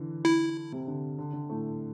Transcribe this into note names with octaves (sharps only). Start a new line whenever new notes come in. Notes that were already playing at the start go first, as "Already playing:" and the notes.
Already playing: D3 E3
E4
C3
D3
D3
D3
A2 A3